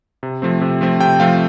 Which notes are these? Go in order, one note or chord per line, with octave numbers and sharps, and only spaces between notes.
C3
F3 A3 C4
C3
F3 A3 C4
C3 G5
F3 A3 C4 F5